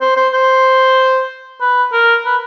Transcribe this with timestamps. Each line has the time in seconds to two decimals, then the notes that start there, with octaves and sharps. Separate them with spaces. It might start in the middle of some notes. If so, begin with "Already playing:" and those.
0.01 C5
0.16 C5
0.33 C5
1.61 B4
1.92 A#4
2.25 B4